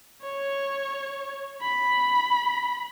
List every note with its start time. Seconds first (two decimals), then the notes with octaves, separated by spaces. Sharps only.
0.22 C#5
1.62 B5